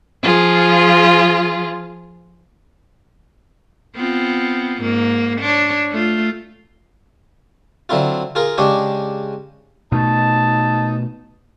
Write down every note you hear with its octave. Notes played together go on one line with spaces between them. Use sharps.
F3 F4 G#4
B3 C4 F4
G#2 A#3
D4 C#5
A3 F4
D3 F#3 C4 E4 F4
F4 G#4 A#4
C#3 G#3 D4 G4 C#5
B2 A3 D#4 A5